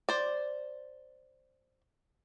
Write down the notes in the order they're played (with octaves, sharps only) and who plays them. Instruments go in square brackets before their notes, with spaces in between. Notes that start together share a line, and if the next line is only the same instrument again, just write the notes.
[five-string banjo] C5 D5